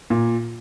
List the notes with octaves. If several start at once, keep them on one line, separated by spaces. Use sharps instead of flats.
A#2